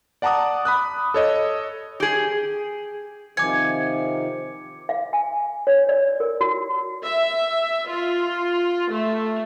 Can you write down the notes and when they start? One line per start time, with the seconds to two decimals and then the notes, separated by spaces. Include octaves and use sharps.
0.22 D5 F#5 A5 A#5 D6 D#6
0.65 B5 D#6 F#6
1.14 A4 C#5 D#5
2.00 G4 G#4
3.37 C3 D#3 F3 G#5 D6 C#7
4.89 F5
5.13 G#5
5.67 C#5
5.89 D5
6.20 A#4
6.41 F#4
7.03 E5
7.89 F4
8.88 A3